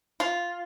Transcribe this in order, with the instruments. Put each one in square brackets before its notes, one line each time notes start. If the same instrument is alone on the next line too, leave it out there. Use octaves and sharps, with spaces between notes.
[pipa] F4